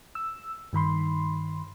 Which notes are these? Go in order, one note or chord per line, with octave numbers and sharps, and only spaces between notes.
E6
G2 D#3 B5 C6